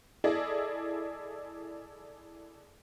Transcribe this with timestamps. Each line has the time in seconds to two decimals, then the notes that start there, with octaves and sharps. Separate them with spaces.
0.24 E4 G#4 A4 D5 D#5